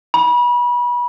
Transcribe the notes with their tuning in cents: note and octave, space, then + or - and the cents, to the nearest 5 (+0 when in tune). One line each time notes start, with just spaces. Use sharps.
B5 -30